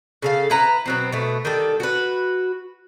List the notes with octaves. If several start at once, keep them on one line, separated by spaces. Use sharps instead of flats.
C#3 A4 F5
E4 B4 A#5
B2 F#3 C4
B2 A3
D#3 G3 A4
F#4 B4